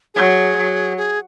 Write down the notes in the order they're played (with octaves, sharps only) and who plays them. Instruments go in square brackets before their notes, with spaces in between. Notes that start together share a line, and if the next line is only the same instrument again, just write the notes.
[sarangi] F#3 [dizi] G#4
[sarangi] F#3
[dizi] G#4